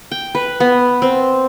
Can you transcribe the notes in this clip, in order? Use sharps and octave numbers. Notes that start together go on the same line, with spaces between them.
G5
B4
B3
C4